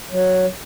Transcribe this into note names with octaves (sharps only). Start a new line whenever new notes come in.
F#3